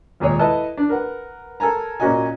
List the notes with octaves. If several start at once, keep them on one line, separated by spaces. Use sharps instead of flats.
D#2 A#2 G#3 G#4 C#5
E4 A4 B4 D#5 A5
D4
A#4 B4 F#5
A4 A#4 G#5 A#5
A#2 A#3 C#4 F#4 D#5 G#5